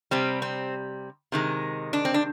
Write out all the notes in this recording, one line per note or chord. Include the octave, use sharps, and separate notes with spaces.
C3 G3 C4
C4
C3 D#3 G#3
D4
C4
D4